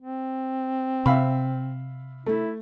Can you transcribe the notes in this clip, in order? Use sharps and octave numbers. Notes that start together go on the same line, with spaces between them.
C4
C3 E5 F5 B5
A3 E4